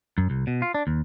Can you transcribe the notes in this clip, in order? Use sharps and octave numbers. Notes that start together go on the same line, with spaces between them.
F#2
C2
B2
F4
D4
D#2